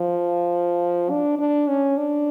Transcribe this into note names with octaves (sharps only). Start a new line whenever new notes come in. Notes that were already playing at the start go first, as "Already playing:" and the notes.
Already playing: F3
D4
D4
C#4
D4